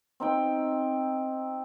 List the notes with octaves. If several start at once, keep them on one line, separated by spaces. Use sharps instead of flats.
C4 D#4 G5